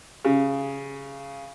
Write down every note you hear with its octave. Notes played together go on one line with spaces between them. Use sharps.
C#3